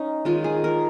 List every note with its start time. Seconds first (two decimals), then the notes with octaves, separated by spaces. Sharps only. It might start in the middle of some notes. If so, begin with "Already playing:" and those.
Already playing: C#4 D#4
0.25 D#3 G#3 F4
0.44 G#4
0.64 A#4